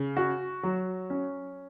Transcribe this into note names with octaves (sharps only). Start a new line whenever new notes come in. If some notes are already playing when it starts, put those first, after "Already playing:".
Already playing: C#3
F#4
F#3
C#4